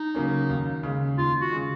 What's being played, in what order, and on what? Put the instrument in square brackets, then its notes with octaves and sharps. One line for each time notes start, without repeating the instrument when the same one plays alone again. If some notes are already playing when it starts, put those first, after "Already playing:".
Already playing: [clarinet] D#4
[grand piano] C#3 F#3 A#3 C#4
D#2
C#3 G#3
[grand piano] D#2 [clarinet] F4
[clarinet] F#4
[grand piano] C#3 G#3